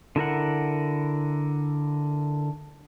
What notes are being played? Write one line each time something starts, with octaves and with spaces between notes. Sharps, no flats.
D3 E4 A#4 F#5